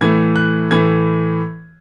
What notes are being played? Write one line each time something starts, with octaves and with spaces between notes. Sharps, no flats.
A2 E3 A3 G#6
F#6
A2 E3 A3 G#6